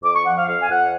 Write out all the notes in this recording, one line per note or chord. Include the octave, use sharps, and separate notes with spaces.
F2 D6
C#6
F3 F#5
F5
F2 F5
G#5
F2 F#5